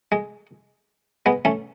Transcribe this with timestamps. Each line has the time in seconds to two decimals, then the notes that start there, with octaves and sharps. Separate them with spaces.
0.12 G#3
1.26 G#3 B3
1.45 A3 C#4